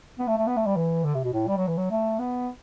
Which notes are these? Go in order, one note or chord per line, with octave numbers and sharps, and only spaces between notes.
B3
A3
A3
B3
A3
G3
E3
D3
C3
B2
A2
G3
F#3
E3
F#3
A3
B3